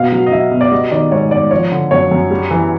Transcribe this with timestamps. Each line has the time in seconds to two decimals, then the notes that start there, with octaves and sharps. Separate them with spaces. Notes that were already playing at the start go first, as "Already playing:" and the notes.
Already playing: B2 F5
0.12 F#3
0.26 D#5
0.32 F#3 E5
0.51 B2
0.61 D5
0.72 G3 D#5
0.91 D#3 D5
1.12 G#2 C#5
1.31 G#2 D5
1.51 F3 C#5
1.71 D3
1.91 F#2 C#5
2.11 F#2
2.31 G3
2.51 E3